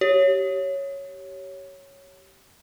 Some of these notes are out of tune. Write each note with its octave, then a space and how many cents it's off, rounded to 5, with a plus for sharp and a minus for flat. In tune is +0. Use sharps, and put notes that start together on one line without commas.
G4 -20 C#5 +0